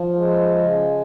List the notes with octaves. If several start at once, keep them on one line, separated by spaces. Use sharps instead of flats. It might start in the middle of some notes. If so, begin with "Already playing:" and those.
Already playing: F3
G#3
C#3